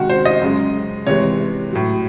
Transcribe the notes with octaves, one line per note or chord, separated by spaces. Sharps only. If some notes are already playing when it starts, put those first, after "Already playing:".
Already playing: C3 D#3 G#3 F#4
C5
D#5
F#2 C#3 G#3
C3 E3 G#3 C#5
A2 F#3